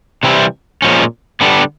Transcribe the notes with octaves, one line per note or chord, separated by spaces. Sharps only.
C3 E3 G3 C4 E4
A#2 F3 G#3 C#4
D3 G3 B3 D4